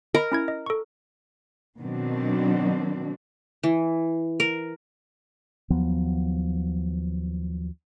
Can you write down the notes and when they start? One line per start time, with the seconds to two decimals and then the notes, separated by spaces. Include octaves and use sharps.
0.14 A#4 D#5 B5
0.32 C#4 E4 G#6
0.48 D#5
0.66 A4 C#6
1.79 B2 D#3 F#3 C4 D4
3.63 E3
4.40 A#4
5.70 D#2 F3 F#3 B3